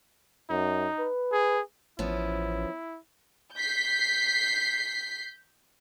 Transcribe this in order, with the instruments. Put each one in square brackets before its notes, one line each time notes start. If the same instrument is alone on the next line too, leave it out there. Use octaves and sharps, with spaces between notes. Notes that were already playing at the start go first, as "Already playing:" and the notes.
[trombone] F#2 [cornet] D#4
[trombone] B4
[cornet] G#4
[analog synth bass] A1 [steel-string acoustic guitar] F3 B3 C#4 [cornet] E4
[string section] G6 B6 C7